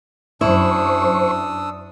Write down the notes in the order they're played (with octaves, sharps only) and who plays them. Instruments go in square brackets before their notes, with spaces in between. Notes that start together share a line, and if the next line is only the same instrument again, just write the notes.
[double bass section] F#2 [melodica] D4 D#6 E6 [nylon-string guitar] E4 [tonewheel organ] C5 C#6